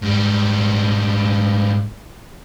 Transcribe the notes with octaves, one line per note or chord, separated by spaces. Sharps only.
G#2 G3